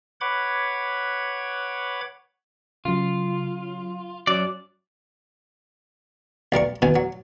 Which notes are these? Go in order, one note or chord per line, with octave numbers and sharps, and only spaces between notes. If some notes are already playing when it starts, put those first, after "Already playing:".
B4 C#5 F#5 B5 D6 G#6
C#3 F#3 F4
F#2 F#3 D5
B1 G3 A#4 C#6
B2 D#3 G#5
F#3